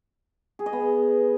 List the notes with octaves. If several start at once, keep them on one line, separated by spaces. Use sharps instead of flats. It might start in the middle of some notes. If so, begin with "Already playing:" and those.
G#4
D#5
B3